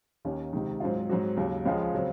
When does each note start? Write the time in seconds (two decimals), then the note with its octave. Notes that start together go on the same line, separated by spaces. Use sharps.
0.25 D#2 D#3 A#3 C#4
0.53 C#2 C3 D#3
0.80 G#2 F#3 C4 F4
1.09 G#2 F#3 C4 F#4
1.37 D#2 C#3 F#3
1.66 C#2 C#3 F3 G#3
1.94 C#3 F#3 C4